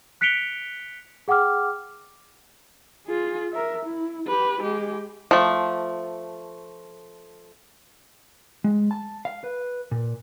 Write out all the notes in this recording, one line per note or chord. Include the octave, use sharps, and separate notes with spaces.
F#6 B6 C#7 D7 F7 G7
G#4 F#5 G5 D6 F6
F4 G#4
A#4 E5
E4
G4 B4
G#3 G4
F3 A3
G#3
A5
F5
B4
A#2